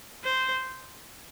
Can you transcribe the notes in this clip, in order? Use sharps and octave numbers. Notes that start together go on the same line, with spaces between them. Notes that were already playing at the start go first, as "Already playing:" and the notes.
C5